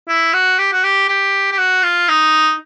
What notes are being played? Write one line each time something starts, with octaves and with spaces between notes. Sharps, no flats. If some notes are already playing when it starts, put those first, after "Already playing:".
E4
F#4
G4
F#4
G4
G4
G4
F#4
F4
D#4